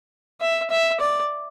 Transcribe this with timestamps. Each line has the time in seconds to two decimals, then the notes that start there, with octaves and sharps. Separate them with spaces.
0.40 E5
0.70 E5
1.00 D5